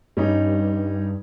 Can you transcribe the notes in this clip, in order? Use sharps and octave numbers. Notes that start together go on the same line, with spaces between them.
G2 G3 C#4 D#4